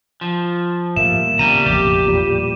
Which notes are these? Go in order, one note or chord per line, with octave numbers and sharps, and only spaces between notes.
F3
A2 D#3 G3 A#3 E5 E7
C#3 G3 B3 A#5 D#7
E1 A1 F2 G4
A#2 E3 G3